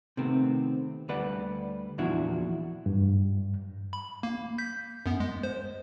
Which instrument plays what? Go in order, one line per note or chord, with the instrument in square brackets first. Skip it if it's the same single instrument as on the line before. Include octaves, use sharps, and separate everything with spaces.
[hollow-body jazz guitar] C3 D#3 A3 B3 C4
D2 G3 B4 D5 F#5
E2 A#2 F3 D4 E4 F#4
[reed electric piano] G2
[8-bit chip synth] B5
A#3
G6 B6
F#2 B3
G#3
C5